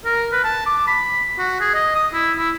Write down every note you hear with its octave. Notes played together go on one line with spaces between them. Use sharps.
A#4
B4
A5
D6
B5
F#4
G#4
D#5
D#6
E4
E4